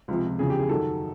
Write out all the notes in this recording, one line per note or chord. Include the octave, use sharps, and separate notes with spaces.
C#2 C3 F3
E2 C#3 F3 G#4
G4
G#4
F#2 D#3 F#3 A4